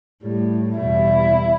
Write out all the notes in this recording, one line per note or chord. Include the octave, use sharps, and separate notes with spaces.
A2 G3
E2 B2 G3 E4